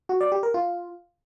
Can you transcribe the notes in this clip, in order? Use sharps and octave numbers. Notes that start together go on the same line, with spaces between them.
F#4
D5
G4
A#4
F4